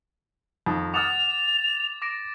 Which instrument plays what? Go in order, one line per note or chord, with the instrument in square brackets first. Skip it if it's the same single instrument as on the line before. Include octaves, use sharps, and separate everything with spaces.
[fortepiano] F2 D#3
[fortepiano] F#5 D#6 F6 [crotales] D6 A6 [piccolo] F7
[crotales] D6 A#6 D7